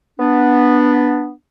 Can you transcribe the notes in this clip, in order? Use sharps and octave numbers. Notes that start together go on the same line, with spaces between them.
B3 D4